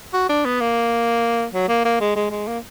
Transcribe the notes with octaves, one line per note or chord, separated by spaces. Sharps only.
F#4
D4
B3
A#3
F#3
A#3
A#3
G#3
G#3
G#3
A#3